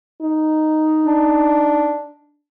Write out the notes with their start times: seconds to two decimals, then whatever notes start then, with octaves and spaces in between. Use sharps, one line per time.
0.22 D#4
1.04 D4